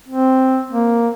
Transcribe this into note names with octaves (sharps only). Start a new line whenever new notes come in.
C4
A#3